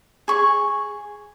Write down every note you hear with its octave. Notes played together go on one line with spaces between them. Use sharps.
G#4 C#6